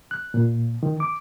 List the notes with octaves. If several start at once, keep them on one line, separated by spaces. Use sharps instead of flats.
F#6
A#2
D#3
D6